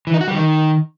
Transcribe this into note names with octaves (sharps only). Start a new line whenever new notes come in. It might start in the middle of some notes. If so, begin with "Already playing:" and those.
E3
D#4
F#4
G3
D#3